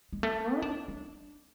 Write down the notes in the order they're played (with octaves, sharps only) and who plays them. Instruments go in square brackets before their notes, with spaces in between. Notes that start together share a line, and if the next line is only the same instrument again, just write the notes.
[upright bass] G#3
A3
E4
D4
D4